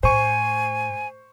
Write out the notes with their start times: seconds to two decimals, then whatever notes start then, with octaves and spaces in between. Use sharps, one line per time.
0.03 A2 C5 G#5 C#6